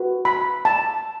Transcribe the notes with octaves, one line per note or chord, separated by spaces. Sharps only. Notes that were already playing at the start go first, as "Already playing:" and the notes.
Already playing: F#4 B4
B5
A5